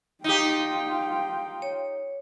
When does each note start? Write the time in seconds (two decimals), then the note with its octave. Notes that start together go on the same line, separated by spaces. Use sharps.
0.24 D#4 F4 G4 G5
1.62 C#5